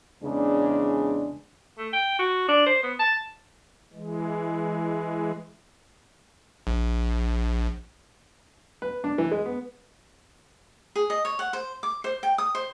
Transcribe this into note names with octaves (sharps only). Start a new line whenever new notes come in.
E2 C#3 G#3 D4
A3
G5
F#4
D4
C5
B3
A5
E3 G#3
A#1
B4
D4
E3
G#3
B3
G#4
D#5
C#5
F#5
C5
D6
C5
G5
D#6
C5